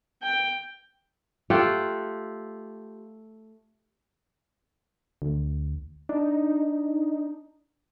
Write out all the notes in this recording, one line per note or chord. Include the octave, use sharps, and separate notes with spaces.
G5
A3 F4 G4 F#5
D2
D4 D#4